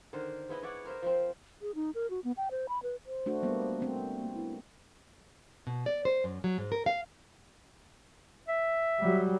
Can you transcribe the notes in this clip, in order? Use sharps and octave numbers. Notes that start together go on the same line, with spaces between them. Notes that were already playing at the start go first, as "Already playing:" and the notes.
D3 D#3 A#4 C5
G#3 B3 E4 D#5
E4 C#5 D5 F#5
A#4 C5 D#5 E5
F3 C4
G#4
D#4
A#4
F#4
B3
G5
C5
B5
B4
C5
A3 D4 F#4
G3 A#3 B3
A3 C4
A#3
E4
B2
D5
C5
F#2
F#3
G#2
A#4
F5
E5
F#3 G3